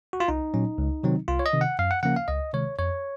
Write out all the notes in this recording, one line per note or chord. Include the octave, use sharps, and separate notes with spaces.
F#4
F4
C2 D#4
A#2 F#3 C#4
C#2
C3 D#3 F#3 C4
C2 F4
C#5
D#5
C3 D#3
F#5
F#2 F5
F#5
C#3 F3 A#3 C#4 F#5
F5
C#2 D#5
C3 D#3 G#3 C#5
F2 C#5